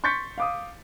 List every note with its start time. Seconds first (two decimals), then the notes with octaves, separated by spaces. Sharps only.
0.04 C6 C#6 G6 A6 B6 C#7
0.38 F5 D6 D#6